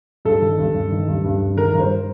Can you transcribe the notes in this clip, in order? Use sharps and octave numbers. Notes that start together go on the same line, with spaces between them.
G2 A4
D#3
G2
G2
D#3
G2
G2
G2
D#3 A#4
G2
C5